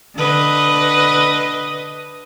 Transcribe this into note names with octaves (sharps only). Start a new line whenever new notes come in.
D3 B4 D#5